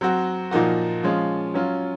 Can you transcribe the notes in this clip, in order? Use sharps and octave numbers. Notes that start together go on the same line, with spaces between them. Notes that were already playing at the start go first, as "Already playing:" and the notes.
F#3 C4 F#4
A#2 F3 A#3 D#4 F#4
F3 G#3 C#4 F4
F#3 C#4 F4